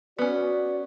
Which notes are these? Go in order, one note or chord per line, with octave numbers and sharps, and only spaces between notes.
B3 C#4 F#4 D5